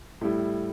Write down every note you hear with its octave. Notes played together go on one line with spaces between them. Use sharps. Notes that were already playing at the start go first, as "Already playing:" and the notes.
A2 G3 E4